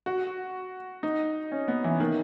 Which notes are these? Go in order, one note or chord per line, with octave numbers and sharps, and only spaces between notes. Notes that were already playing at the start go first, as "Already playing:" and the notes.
F#4
D#4
C#4
B3
E3
D#3